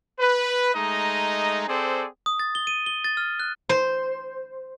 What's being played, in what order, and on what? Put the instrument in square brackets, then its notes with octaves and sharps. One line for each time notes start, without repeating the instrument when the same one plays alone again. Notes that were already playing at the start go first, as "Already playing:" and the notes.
[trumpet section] B4
G#3 A3 D#4 D#5 A#5
C4 G#4 A4 C5 D5
[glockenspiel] D#6
A6
G7
D#7
G7
A6
F6
F#6
[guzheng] C5